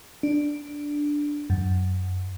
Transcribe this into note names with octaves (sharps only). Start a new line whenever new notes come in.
D4
F#2